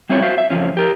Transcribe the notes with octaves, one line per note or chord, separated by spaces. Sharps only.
G3 C4 E4 F4 C#5
F#4 C5 E5 F5
E5
F2 G#2 C#3 F3 C#4
G4 A#4